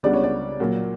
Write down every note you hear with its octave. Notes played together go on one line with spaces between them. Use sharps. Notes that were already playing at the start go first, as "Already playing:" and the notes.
C#2 C#3 G3 B3 D4 D5
C#5
D5
A#2 F#3 A#3